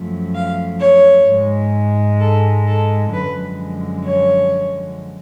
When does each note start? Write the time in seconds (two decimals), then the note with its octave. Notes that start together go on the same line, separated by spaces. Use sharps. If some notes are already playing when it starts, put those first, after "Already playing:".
Already playing: F#2 F3 A3
0.35 F5
0.80 C#5
1.27 G#2 G#3
2.20 A4
2.67 A4
3.13 F#2 D3 F3 G#3 B4
4.06 C#5